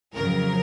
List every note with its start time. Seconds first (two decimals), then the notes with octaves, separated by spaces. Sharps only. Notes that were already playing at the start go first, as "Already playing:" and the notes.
0.15 F2 C#3 F#3 A#4